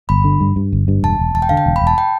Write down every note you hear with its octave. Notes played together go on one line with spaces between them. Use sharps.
G1 B5
D3
G2
G2
G1
G2
E1 A5
E1
E1 A5
G5
D3 F5
G5
E1
B5
E1
A5
G5